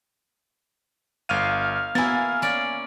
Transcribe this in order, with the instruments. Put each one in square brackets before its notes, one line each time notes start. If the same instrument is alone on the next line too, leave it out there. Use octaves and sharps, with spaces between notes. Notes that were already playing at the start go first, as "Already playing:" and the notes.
[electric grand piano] G1 F6 D#7 [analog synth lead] F5
[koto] A#3 E4 [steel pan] B3 [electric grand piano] G#5 A6
[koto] C#4 D5